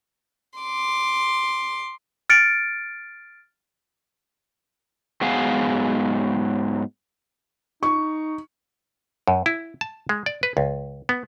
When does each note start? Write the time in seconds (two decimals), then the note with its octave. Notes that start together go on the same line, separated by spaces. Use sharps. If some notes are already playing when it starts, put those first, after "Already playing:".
0.59 C6 D6
2.30 F6 A6 C#7 D7
5.21 G#2 F#3 B3 G#4 F5 G#5
7.83 D#4 C#6
9.28 F#2
9.46 E4
9.81 A5
10.09 G#3
10.26 D5
10.43 B4
10.57 C#2
11.09 B3